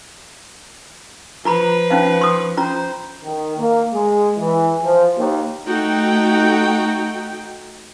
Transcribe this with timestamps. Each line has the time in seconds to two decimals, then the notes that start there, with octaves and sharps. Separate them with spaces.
1.45 F3 F4 B4 A#5 B5
1.90 C#4 D#4 F5
2.21 C6 D#6
2.57 C#4 F4 C5 A#5
3.25 D#3
3.58 A#3
3.94 G#3
4.38 E3
4.84 F3
5.18 D#2
5.66 A3 D#4 F#4 G5